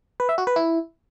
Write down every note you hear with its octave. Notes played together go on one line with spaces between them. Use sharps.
B4
E5
F#4
B4
E4